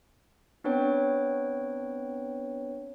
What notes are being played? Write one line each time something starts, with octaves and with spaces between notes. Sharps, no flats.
B3 C4 D4 B4 C#5 G5